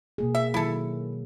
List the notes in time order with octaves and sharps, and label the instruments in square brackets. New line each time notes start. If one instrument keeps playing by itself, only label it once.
[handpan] B2 A#3 G#4
[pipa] E5
[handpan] D#3 F#3 [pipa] E4 A4